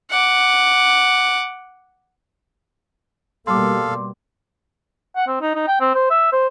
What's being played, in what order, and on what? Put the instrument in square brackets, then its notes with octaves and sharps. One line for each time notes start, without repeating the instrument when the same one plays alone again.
[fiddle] F#5 D6
[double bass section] B2 G3 A#3 [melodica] A4 F5 [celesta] C6 D6
[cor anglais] F#5
C4
D#4
D#4
G5
C4
C5
E5
C5